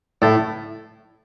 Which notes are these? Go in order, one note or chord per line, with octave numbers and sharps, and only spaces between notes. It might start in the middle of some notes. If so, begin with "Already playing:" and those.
A2